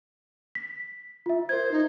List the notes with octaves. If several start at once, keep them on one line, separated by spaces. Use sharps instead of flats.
B6
F4 E5
A#4 C5 G#6
D#4